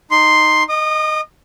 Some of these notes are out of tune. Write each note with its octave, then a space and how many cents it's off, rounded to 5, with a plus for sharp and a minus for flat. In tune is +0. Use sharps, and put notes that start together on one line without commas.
D#4 -5 C6 +0
D#5 +0 D#6 -35